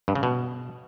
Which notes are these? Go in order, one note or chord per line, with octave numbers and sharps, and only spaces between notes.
G2
C#3
B2